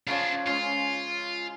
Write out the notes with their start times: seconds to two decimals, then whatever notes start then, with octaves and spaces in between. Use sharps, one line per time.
0.07 C#3 F3 D4 F4 C#5
0.47 G#3 C#4 F4